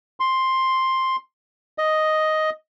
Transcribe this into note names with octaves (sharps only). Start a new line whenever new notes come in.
C6
D#5